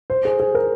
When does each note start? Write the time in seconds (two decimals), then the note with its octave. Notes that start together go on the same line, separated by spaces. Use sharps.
0.10 C5
0.25 G#4
0.40 G#4
0.55 A#4